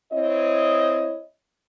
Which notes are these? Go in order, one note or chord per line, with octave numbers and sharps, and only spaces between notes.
C4 E4 C#5 D#5